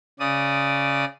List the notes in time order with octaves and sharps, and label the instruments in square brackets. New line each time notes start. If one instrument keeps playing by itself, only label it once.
[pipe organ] C#3 D5 D#6